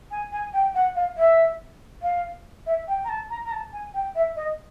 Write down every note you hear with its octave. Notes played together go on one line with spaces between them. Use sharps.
G#5
G#5
G5
F#5
F5
E5
F5
E5
G5
A#5
A5
A#5
A#5
A5
G#5
G5
E5
D#5